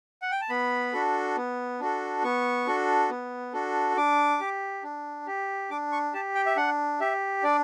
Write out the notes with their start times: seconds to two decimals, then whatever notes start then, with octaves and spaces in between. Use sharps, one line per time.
0.22 F#5
0.31 G5
0.41 A5
0.49 B3 B5
0.93 D4 F#4 A4
1.37 B3
1.80 D4 F#4 A4
2.24 B3 C#6
2.67 D4 F#4 A4
3.10 B3
3.53 D4 F#4 A4
3.97 D4 D6
4.40 G4
4.83 D4
5.27 G4
5.70 D4 D6
5.92 C#6
6.14 G4 A5
6.35 G5
6.46 E5
6.57 D4 F#5
7.00 G4 E5
7.43 D4 D5